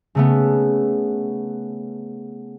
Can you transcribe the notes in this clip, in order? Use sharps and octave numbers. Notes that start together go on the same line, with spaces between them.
C#3 A3 B3